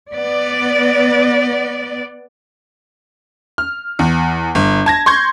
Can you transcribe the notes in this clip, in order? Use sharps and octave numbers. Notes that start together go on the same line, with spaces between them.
B3 D5
F6
E2
G1
A5 G#6 A#6
C6 C#6 G6 G#6